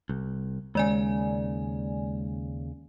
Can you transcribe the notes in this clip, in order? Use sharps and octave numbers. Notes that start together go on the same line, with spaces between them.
C2
D#2 C#3 G#3 D5 G#5